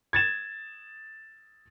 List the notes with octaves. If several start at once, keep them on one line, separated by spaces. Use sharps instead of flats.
G#6 A6 E7